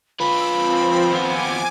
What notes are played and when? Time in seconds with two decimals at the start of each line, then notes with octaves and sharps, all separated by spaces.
0.20 F4 B4 B5 E6 D7
0.50 F3 C4
1.12 D#2 B3 G#5 D6